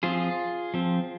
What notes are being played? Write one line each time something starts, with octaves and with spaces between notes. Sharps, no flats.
F3 C4 F4 G#4
F3 C4